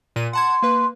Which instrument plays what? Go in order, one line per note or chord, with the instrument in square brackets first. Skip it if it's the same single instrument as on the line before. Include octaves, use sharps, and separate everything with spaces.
[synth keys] A#2 D#7
[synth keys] F#5 A5 G#6 [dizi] C6
[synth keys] A#3 B4